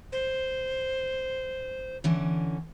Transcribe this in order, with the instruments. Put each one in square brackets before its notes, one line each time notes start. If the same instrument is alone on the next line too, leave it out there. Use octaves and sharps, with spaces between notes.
[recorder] C5
[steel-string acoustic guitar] D3 E3 C#4